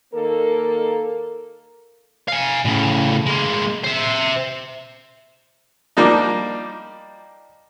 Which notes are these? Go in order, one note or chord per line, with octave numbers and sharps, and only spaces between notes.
D#3 A#3 A4 A#4
F5 G#5
A2 C#3
G#3 A#3
C5 E5
F3 G3 A#3 D4 D#4